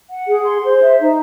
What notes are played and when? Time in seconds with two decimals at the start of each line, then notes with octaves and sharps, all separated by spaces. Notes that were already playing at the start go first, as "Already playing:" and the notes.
0.10 F#5
0.28 G#4
0.45 C6
0.63 C5
0.80 E5
0.99 D#4